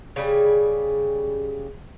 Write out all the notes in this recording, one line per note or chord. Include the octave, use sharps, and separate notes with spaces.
C#3 G3 G#4